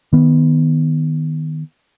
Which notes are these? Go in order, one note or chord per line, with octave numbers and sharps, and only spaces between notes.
D#3 B3